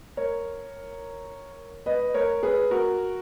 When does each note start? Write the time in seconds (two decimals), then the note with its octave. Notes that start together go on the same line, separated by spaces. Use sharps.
0.17 A#4 C#5
1.86 B4 D#5
2.14 A#4 C#5
2.43 G#4 B4
2.71 F#4 A#4